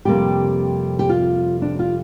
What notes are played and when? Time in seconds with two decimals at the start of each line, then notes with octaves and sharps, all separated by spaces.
0.05 F2 C3 G3 A#3 G4
0.99 G4
1.09 F4
1.62 D4
1.79 F4